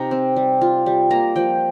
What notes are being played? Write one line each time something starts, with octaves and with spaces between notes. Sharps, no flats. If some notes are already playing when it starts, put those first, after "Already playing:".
Already playing: C3 D#4 G5 A#5
C4
G3
F4
G3
A#3 A#5
F3 G5